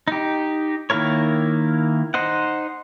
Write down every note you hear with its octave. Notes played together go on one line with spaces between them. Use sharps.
D#4 G4
D#3 A#3 E4 A#4 C#5
D#4 C5 D#5 F#5